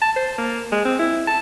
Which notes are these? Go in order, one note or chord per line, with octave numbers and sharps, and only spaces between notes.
A5
C5
A#3
G#3
C4
E4
A5